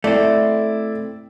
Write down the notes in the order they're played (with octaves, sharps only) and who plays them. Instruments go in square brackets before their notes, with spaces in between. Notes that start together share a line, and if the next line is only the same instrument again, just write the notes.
[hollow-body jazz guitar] A3 C4 [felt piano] E4 D5